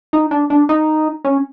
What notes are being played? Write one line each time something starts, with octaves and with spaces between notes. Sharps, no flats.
D#4
D4
D4
D#4
C#4